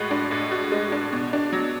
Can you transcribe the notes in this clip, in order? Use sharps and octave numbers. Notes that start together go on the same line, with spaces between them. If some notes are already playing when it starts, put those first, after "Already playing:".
Already playing: A2 G#3 F#4
D4
A2
F#4
G#3
D4
B2
D4
F#3